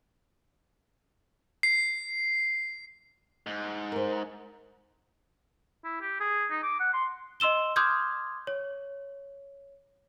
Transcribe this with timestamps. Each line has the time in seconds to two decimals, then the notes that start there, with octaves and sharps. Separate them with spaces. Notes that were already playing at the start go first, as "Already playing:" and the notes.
1.63 C7
3.47 G#2
3.92 A#4 C5
5.84 E4
6.01 G4
6.20 G#4
6.50 D#4
6.63 D6
6.80 F#5
6.93 C6
7.40 D#5 C6 E6 E7 G7
7.76 C6 D6 D#6 F6 G6 G#6
8.47 C#5